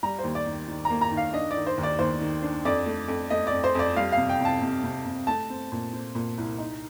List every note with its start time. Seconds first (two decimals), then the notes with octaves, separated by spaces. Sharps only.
0.03 G3 A#5
0.19 C5
0.24 D#2
0.35 D5
0.47 D#3
0.68 D#3
0.85 A#3 A#5
1.01 A#5
1.11 D#3
1.17 F5
1.33 D4 D#5
1.51 D5
1.56 D#3
1.67 C5
1.78 D#2
1.83 D5
1.99 D#2 C5
2.21 D#3
2.43 D4
2.65 F2 D5
2.86 A3
3.08 F2
3.30 A3 D#5
3.47 D5
3.52 F2
3.64 C5
3.75 F2 D5
3.96 G3 F5
4.12 F5
4.18 C3
4.29 G5
4.41 C3 A5
4.62 C3
4.84 C3
5.05 C3
5.27 A3 A5
5.50 C4
5.72 A#2
5.93 C4
6.15 A#2
6.38 C2
6.58 D#4